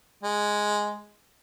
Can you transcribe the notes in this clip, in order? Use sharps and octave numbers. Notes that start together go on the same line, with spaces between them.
G#3